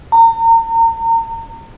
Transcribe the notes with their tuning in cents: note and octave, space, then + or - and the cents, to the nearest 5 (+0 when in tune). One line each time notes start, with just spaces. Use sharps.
A#5 -35